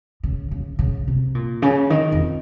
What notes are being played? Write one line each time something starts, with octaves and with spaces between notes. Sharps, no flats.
C#3
C#3
C#3
C3
A#2
C#3
D#3
F2